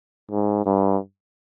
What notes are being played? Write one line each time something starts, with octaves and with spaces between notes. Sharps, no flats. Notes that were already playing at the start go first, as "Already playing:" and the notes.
G#2
G2